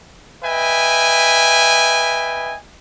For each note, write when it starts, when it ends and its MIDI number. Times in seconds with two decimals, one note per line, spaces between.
0.44 2.56 71
0.44 2.56 75
0.44 2.56 76
0.44 2.56 79
0.44 2.56 80